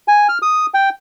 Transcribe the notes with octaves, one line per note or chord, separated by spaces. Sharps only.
G#5
F6
D#6
G5